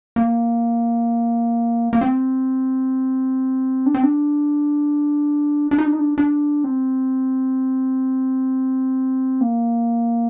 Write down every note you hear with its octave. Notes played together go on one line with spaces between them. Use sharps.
A#3
A#3
C4
D4
C4
D4
D4
D#4
D4
D#4
D4
D4
C4
A#3